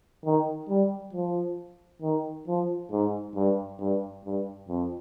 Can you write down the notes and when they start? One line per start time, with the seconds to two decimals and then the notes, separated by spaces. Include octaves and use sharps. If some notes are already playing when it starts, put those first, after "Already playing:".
0.25 D#3
0.69 G3
1.13 F3
2.02 D#3
2.47 F3
2.91 G#2
3.35 G2
3.80 G2
4.25 G2
4.68 F2